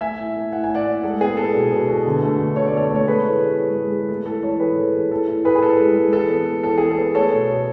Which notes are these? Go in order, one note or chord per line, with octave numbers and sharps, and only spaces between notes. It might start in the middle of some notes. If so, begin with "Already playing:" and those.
A3 E5 G#5
A2
A3
A2 F#5
G#5
A2
D5 F#5
A2
G#3 A4
B3 G#4
B3 A4
B2
B2
B2
D3
A3
D3
A3 C#5
D5
A3 A4 C#5
A3
C#5
G#3 G#4 B4
A2
B3
G#3
G#3
G#3
A3 A4
A2 A4
E3 A4 C#5
A2 G#4 B4
E3
A2
A2 A4
A2
A2 G#4 B4
G#4
A2 A4
G#3
G#3
E3 A4
B3
B3
E3 A4
B3 G#4
A4
B3
A3 A4 C#5
B2
B2